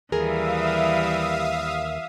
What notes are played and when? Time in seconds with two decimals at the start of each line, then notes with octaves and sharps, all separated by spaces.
0.12 D#2 E3 G3 G#4 A#4 E5 F5 D#6